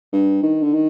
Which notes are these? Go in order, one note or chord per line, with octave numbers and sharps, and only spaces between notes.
G2
D#3
D3
D#3